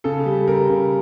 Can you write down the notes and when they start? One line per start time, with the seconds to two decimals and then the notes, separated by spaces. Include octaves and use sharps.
0.04 C#3 A4
0.26 G3
0.48 G3 A#4
0.69 C#3